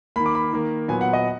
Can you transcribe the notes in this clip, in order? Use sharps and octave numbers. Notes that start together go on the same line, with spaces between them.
D#3 A#3 B5
D6
B5
D#3 A#3
A#2 F#3 B3 G#5
F#5
D#5